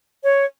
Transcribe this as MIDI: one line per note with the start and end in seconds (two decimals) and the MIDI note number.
0.24 0.45 73